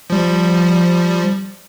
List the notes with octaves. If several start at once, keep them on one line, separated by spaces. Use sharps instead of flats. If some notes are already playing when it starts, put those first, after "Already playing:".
F3 G3